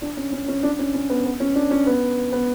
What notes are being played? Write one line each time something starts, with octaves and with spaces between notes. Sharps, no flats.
D4
C#4
C#4
C#4
D4
C#4
C#4
B3
B3
C#4
D4
C#4
B3
B3